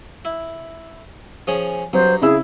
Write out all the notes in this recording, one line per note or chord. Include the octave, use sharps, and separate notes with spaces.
E4
F3 C#4 G#4
G2 F#3 C5
C#3 E4 G#4 E6